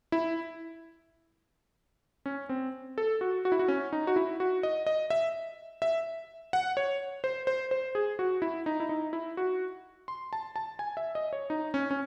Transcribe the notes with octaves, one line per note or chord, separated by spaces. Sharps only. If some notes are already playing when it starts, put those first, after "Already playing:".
E4
C#4
C4
A4
F#4
F#4
E4
F#4
C#4
D#4
F#4
E4
F#4
D#5
D#5
E5
E5
F#5
C#5
C5
C5
C5
G#4
F#4
E4
D#4
E4
D#4
E4
F#4
C6
A5
A5
G#5
E5
D#5
C#5
D#4
C#4
C#4